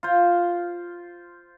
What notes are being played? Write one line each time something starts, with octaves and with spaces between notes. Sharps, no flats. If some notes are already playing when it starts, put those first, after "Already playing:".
F4 C5